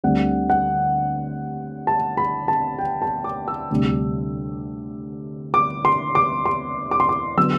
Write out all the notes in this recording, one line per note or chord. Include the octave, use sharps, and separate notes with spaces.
D2 D3 G3 C4 F#5
F#5
A5
B5
A5
G5
A5
D6
E6
D2 C3 G3 D4
D6
C6
D6
C6
D6
C6
D6
D3 F#3 B3 E6